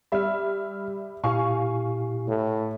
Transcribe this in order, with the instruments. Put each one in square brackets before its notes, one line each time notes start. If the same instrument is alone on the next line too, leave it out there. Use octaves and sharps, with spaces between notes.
[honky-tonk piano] G3 E5 [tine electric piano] B5 F6
[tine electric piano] A#2 E4 G4 [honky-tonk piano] F5 G#5 C#6
[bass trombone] A2